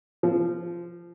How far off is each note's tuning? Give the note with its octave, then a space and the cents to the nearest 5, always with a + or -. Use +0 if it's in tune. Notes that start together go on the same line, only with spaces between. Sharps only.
F3 -15